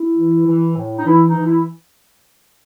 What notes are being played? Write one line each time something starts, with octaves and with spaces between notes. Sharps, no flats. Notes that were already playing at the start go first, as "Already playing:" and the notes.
Already playing: E4
E3
E3
A2
D#4
E3 E4
D#4
E3
E4